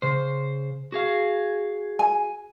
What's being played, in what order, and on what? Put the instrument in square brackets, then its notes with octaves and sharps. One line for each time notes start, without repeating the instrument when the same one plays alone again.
[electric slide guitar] C#3 C5
F#4 G#4 F5
[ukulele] G#5